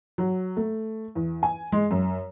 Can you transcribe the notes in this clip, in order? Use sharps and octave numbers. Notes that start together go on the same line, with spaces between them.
F#3
A3
E2
G#5
G#3
F#2